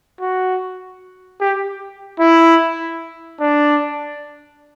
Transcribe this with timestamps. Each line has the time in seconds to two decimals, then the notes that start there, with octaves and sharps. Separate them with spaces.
0.20 F#4
1.40 G4
2.20 E4
3.40 D4